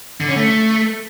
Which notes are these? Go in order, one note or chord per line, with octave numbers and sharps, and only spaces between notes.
D3
C#4
A3